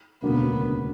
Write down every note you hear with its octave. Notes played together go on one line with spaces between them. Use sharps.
E1 D2 C#3 F#3 A#3 B3